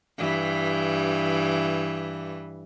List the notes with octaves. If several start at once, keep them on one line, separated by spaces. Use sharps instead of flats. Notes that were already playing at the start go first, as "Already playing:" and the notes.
G2 E3